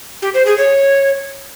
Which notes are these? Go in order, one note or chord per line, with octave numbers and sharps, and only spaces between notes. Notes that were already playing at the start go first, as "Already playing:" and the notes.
G4
C5
G#4
C#5